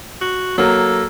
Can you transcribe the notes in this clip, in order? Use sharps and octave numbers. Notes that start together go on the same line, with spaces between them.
F#4
F#3 A#3 A4